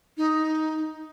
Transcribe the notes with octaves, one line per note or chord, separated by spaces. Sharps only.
D#4